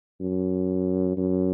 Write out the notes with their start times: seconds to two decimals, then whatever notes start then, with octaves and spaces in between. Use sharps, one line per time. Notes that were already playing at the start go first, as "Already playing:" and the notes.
0.20 F#2
1.17 F#2